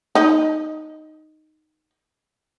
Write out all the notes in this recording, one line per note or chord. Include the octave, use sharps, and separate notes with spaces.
D#4 D#5